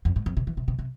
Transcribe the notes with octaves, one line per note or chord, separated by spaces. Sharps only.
F2
G#2
F2
C3
E3
C3
C3
C3